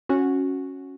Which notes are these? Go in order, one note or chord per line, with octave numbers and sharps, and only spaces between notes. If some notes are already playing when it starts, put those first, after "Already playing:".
C#4 F#4